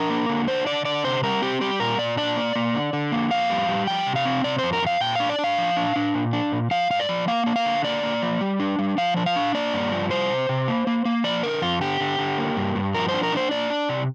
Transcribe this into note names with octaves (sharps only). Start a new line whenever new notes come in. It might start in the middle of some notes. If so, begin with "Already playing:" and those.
Already playing: D4 A#4
A#3
D3
D4 C5
D3 D5
D3 D5
C3 C5
G3 A#4
C4 G4
G3 G4
A#2 A#4
A#2 D5
D4 D5
A#3
A#3
D3
D3
A#3
F2 F5
G3
G3
F3 G5
C3
F5
C4
C3 D5
F2 C5
A#4
F2 F5
A#2 G5
D4 F5
D5
D4
F5
F3
D4
D4
A#2
D4
A#2
F3 F5
G2 F5
D5
F3
A#3 F5
D4
F5
D3
A#3 D5
A#3
F3
G3
D4
G3
F3 F5
D4
F5
D4
A#3 D5
G2
F3
G3 C5
C3
C3
A#3
A#3
A#3
F3 D5
D3 A#4
F2 F4
D3 G4
D3
D3
A#3
G2
G2
F3 A#4
C5
D4
A#4
D4 C5
A#3 D5
D4
C3